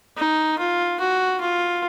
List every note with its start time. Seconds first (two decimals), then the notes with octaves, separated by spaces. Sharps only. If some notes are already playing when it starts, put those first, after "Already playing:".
0.17 D#4
0.58 F4
1.00 F#4
1.40 F4